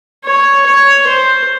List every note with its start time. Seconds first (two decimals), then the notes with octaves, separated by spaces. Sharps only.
0.25 C#5
0.66 C#5
1.08 C5